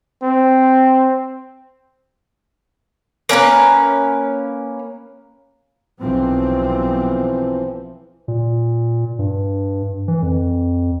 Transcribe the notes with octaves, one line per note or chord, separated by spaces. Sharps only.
C4
A#3 C#4 A#4 B4
B1 E3 F3 C4
A#2
G2
E3
F2